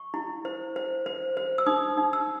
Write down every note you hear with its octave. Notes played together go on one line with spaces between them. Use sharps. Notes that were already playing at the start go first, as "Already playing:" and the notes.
Already playing: C#6
E4
C5
C5
C5
C5
E6
D#4 D#6
D#4
E6